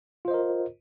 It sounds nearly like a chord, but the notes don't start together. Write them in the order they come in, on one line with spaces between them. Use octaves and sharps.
F4 C5 D#5 A#4